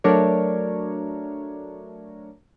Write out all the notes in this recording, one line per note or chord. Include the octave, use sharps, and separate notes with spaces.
F#3 A3 D4 A#4 C#5